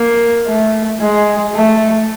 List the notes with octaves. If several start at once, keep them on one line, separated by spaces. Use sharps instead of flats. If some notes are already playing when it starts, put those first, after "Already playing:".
Already playing: A#3
A3
G#3
A3